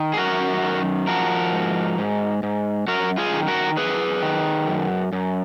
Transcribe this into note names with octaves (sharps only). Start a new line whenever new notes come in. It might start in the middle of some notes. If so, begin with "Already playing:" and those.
Already playing: D#3
G#4
F#2 F#4 A#4
D#3
F3 F#4 A#4
G#2
G#2
G#2
F#2 F#4 A#4
F4 G#4
D#3
F#4 A#4
F#2 G#4 B4
D#3
F#2
F#2